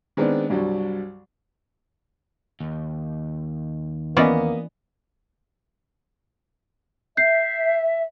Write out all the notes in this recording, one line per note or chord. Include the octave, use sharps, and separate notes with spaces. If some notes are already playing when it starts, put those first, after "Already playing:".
D#3 G#3 B3 C4 D4
C2 G2 F#3 G3
D#2
E3 A#3 B3 C#4 D5 D#5
E5 G6 C7